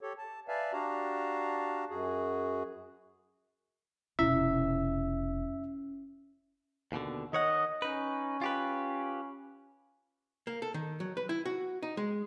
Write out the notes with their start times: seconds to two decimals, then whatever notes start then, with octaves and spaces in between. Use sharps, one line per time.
0.01 G4 A4 C#5
0.18 A5
0.48 B4 D5 E5 F5 G#5 A5
0.73 D4 F#4 G4 F5 A5 A#5
1.90 F#2 F#4 G#4
4.19 F1 B2 C#4 E4 E5
6.92 D#2 B2 D3
7.33 D#3 C#5 D#5 F#5
7.82 C#4 D#4 B4
8.41 F4 G4 B4
10.47 A#3
10.62 A4
10.74 D#3
11.00 F#3
11.17 B4
11.29 E4
11.46 F#4
11.83 D#4
11.97 G#3